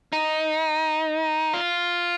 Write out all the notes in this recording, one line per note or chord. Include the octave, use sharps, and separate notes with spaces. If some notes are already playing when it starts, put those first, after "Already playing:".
D#4
F4